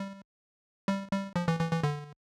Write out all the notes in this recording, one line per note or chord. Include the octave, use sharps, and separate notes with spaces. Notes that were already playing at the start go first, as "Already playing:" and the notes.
Already playing: G3
G3
G3
F3
E3
E3
E3
D3